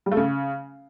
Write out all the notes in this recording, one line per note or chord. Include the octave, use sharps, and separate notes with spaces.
G3
A3
C#3